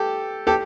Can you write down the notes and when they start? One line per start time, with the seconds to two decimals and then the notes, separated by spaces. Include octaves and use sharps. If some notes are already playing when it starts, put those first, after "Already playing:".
Already playing: G4 A4
0.47 G4 A4